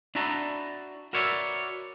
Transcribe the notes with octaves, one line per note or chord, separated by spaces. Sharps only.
D4 E4 F#4 A5 A#5
F#4 A#4 B4 C#5 D5 E5